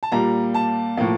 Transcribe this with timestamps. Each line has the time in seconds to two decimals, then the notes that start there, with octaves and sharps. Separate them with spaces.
0.03 A5
0.12 A#2 G3 A#3 A#5
0.54 A5
0.97 A2 F3 A#3